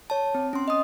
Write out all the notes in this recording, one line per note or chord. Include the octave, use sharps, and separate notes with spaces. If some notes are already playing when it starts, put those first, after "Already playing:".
C#5 A5
C4
C#4 C6
D#5 D#6